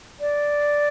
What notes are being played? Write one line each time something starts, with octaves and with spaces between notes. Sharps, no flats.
D5